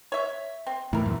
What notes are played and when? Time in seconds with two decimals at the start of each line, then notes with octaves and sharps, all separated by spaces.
0.12 C#5 E5
0.67 C4
0.93 A2 E3 E4 A#4
1.06 F#2 A#2 E3